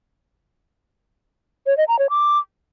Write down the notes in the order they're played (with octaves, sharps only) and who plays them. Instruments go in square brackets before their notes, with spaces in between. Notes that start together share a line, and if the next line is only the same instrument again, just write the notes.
[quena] C#5
D#5
A#5
C#5
D6